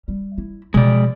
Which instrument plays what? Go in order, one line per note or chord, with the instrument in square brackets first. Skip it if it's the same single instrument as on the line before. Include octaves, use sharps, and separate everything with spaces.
[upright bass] G3
E4
[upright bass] B2 F3 [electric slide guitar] G#3 D5